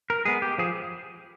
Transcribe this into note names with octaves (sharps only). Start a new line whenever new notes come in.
A#4
G#3 B3 G#4
G4
F3 G#4